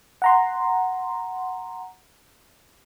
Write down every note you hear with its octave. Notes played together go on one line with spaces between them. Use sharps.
F#5 A#5 C6